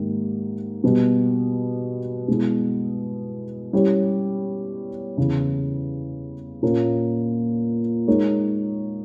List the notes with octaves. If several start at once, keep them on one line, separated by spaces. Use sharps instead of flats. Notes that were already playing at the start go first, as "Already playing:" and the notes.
Already playing: G#2 D#3 A#3 G4
B2 G3 B3 G4
B2 G#3 B3 E4
G3 C#4 E4 G4 C#5
E2 C#3 E3
A#2 A#3 C#4
G#3 D#4 A#4 C#5